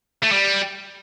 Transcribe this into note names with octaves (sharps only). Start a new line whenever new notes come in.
A3
G3